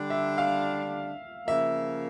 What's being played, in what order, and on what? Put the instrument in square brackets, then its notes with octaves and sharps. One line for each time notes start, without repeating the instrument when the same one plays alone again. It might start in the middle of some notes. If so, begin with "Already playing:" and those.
Already playing: [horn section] D3 G3 D4
[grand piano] E5
F5
[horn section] C#3 F3 A#3 [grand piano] E5